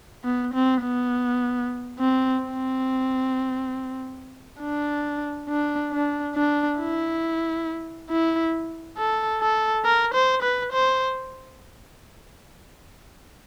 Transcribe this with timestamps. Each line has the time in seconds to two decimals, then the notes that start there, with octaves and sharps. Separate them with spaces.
0.24 B3
0.54 C4
0.82 B3
1.99 C4
2.42 C4
4.60 D4
5.49 D4
5.92 D4
6.36 D4
6.79 E4
8.10 E4
8.98 A4
9.41 A4
9.85 A#4
10.14 C5
10.43 B4
10.72 C5